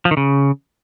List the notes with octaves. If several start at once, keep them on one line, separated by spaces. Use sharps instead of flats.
F3
D#3
C#3